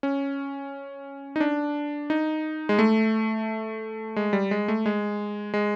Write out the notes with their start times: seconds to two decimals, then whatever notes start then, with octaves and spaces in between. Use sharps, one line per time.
0.03 C#4
1.36 D#4
1.40 D4
2.10 D#4
2.69 G#3
2.79 A3
4.16 G#3
4.33 G3
4.51 G#3
4.68 A3
4.86 G#3
5.54 G#3